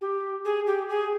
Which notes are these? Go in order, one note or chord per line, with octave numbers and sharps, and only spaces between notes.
G4
G#4
G4
G#4